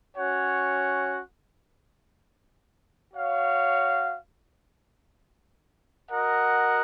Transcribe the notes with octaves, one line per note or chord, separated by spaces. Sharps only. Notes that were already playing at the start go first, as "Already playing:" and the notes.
C#4 F#4 C#5 F#5
F#4 C#5 F5
F#4 A#4 D#5 F#5